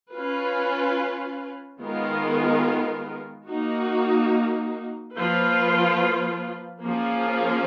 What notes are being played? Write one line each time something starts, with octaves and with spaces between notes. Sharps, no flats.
C#4 F4 B4
D#3 G#3 B3 F4 A#4
A#3 D#4 F#4
F3 A#3 F4 B4
F3 A#3 C#4 F4 G#4